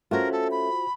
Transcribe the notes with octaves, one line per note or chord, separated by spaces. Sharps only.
A3 C#4 F4 F#4 A#4 C5
A4
B5